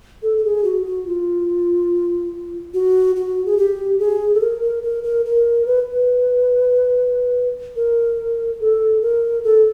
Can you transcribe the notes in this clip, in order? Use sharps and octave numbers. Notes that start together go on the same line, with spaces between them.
A4
A4
G#4
F#4
F#4
F4
F#4
F#4
G#4
G4
G#4
A4
A#4
A#4
A#4
A#4
A#4
B4
B4
A#4
A4
A#4
A4